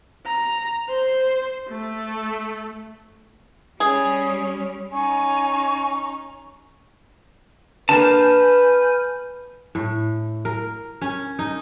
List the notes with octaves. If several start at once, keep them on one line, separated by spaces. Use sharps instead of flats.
A#5
C5
A3
G3 C#4 G#4
C#4 D#4 G#5 C#6
D3 A#3 B4 G#5 A5 F6 G6
A2
A#4
C#4
D#4